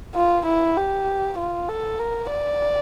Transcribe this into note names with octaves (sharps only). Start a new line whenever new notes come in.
F4
E4
G4
F4
A4
A#4
D5